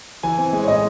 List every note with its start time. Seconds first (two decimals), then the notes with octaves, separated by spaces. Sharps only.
0.23 E3 G#5
0.38 C4
0.53 G#3
0.63 C#5
0.68 A2 D#5